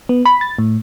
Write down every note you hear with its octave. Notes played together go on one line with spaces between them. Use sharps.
B3
B5
A6
A2